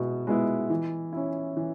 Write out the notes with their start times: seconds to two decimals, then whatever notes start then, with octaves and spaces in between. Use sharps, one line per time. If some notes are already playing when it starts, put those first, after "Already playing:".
Already playing: B2 G#3 B3 E4
0.27 G#3 B3 E4
0.70 E3
1.13 C#4 E4
1.57 E3